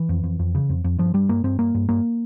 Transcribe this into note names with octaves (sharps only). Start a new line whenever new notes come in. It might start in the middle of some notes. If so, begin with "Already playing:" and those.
Already playing: E3
F2
F2
F2
C#3
F2
F2
G2 F3
G2 G3
G2 A#3
G2 C4
G2 A#3
G2
G2 A#3